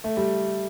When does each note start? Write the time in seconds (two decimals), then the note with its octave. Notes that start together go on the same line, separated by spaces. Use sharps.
0.04 A3
0.17 G3